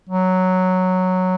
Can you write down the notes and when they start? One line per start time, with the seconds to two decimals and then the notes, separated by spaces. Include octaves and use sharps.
0.09 F#3